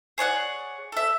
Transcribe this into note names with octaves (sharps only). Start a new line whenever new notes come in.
G#4 C#5 D5 F#5
A4 E5